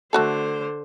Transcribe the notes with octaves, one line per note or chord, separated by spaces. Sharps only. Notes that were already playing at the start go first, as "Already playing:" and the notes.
D3 A3 F#4 A4 C5